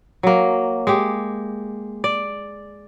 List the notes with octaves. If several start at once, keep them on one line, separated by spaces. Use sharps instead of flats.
F#3 A#3
G#3 G4
D5